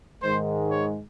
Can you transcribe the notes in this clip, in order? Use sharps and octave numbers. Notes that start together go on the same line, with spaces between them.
G#2 D#3 G#3 C5
C#5